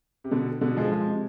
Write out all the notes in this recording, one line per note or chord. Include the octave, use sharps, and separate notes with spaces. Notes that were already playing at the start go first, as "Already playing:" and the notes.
C3
B2 D3
B2 D3
F3 G#3
F3 G#3
C3